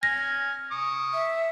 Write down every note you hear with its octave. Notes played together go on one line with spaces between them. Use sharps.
G#5 F6 A#6
C#6 D#6
E5